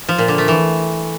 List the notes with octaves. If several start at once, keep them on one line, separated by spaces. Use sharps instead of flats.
F3
A#2
D3
A3
E3